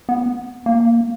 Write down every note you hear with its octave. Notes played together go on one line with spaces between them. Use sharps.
B3
A#3